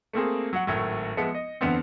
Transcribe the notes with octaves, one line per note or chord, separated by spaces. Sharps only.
A3 A#3 C4 G#4
F#3 F#5
G#1 A2 F#3
F3 G#3 B3 E5 C#7
D#5
E2 D3 B3 C4